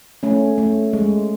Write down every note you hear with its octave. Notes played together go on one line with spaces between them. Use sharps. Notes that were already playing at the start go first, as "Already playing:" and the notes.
A3 C#4
A3
G#3